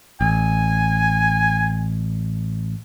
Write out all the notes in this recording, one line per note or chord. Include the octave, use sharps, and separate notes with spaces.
A1 G#5